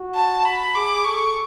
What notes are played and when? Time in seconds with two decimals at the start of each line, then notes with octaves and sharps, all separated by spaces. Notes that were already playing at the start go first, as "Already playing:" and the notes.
Already playing: F#4
0.15 A5
0.45 B5
0.75 G#4 D6
1.04 A4 C#6